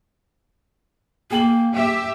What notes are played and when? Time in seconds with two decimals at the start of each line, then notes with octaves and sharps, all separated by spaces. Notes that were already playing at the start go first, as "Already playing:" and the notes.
1.31 A#3 G#4 G5 F#7
1.74 G4 E5